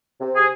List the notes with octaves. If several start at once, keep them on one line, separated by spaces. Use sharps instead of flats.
C3
G#4